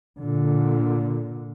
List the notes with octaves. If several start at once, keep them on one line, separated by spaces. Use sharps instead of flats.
A#2 D3